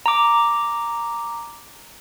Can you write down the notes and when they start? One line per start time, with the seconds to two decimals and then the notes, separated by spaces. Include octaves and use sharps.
0.06 A#5 D6